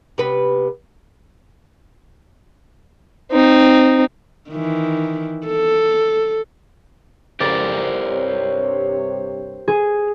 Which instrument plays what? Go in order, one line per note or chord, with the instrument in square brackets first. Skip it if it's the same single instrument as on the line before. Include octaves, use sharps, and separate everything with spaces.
[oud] C3 B3 B4
[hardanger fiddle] C4 D#4
[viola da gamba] D#3 E3
A4
[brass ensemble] F2 G#2 C#3 [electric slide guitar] G4 A#4 C5 [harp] D5
[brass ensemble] G2 C3 C#5
[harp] G#4